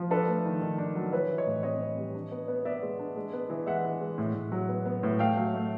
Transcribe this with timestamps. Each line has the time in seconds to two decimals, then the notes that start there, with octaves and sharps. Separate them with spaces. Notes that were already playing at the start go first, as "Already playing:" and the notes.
Already playing: F3
0.11 D4 A4 B4
0.28 A3
0.45 D#3
0.62 D#3
0.78 D4
0.95 F#3
1.13 E3 B4 C#5
1.29 E3
1.38 C#5 D#5
1.46 A2
1.63 C4 C#5 D#5
1.80 C4
1.98 G3
2.15 D4
2.32 B3
2.48 B3
2.65 B3 D5 E5
2.82 G#3
2.99 D4
3.16 G#3
3.33 B3
3.50 E3
3.66 G#3 E5 F#5
3.84 E3
4.01 G#3
4.18 A2
4.34 A2
4.52 F#3
4.69 B3
4.85 B3
5.03 A2
5.19 A3 F5 G5
5.37 F#3
5.54 A3